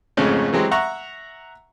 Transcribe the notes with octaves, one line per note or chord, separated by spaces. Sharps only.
F2 G#2 C#3 A3 C#4
E3 F#3 G#3 C4 G4
E5 F#5 A#5 C#6